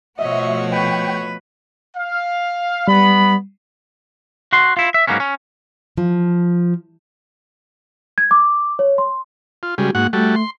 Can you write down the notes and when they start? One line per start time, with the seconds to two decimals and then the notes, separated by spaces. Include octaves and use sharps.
0.19 B2 F3 A3 F#4 C#5 D#5 E5
0.72 B4 G5
1.97 F5
2.88 G3 B3 B5
4.52 F#4 C6
4.77 E4 F4
4.94 E5
5.07 G#2 F#3 A#3 B3 C#4
5.20 C#4
5.98 F3
8.18 G#6
8.31 D6
8.79 C#5
8.98 C6
9.63 F4
9.78 C#3 G3 G#3 F#4
9.95 G#2 A#3 F#4 F#5
10.13 G3 A3 F#4 A4
10.36 C6